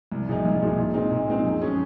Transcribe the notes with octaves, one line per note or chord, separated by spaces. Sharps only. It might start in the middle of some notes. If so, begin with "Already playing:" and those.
C2
A#2 F3 G#3 D#4
C2
A#2 F3 G#3 D#4
A#2
G#3 C4 D#4
A#2
G#3 C4 D#4
F#2
F3 G#3 C#4 G#4